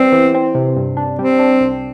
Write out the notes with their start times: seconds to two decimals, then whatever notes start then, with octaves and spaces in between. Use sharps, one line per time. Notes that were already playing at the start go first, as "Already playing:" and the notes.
Already playing: G3 B3 C4
0.12 E3
0.34 C4
0.55 C3
0.76 G2
0.97 D4
1.19 G3 C4
1.39 D4
1.61 C2